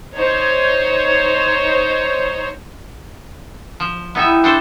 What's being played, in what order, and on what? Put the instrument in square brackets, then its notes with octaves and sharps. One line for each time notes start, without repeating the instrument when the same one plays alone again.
[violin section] D#4 C5 C#5
[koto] F3
[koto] B3 D#4 E5 [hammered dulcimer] E4 G4
[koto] D4 A4 C5